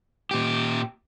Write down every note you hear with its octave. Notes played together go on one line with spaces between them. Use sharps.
A#2 G4